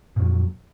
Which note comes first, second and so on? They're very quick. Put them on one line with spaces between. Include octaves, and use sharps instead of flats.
A#2 F2 F#3